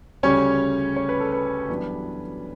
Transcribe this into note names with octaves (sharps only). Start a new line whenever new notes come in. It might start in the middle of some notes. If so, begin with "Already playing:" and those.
D2 C#3 G3 C#4 C#5
C#5
B4
A4
B4
F#2 E3 G3 B3 D4